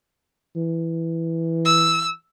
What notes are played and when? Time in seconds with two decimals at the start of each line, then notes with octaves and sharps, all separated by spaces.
0.56 E3
1.65 E6